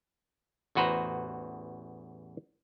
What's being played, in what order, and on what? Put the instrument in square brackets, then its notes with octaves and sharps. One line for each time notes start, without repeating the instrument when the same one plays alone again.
[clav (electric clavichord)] A1 E2 F#4 B4 C5 A#5